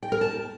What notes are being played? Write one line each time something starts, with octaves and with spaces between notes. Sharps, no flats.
G5
A#4
A5